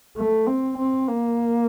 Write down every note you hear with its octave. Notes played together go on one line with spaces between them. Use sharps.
A3
C4
C4
A#3